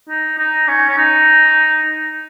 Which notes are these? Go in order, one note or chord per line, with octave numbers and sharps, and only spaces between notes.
D#4
D#4
C#4
C#4
D#4